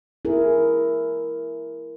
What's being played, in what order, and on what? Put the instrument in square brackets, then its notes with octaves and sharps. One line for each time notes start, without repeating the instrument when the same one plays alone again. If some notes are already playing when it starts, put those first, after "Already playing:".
[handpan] E4 G#4 A#4